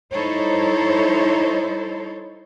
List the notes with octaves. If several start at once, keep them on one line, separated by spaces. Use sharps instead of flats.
G3 D#4 E4 A4 C5 C#5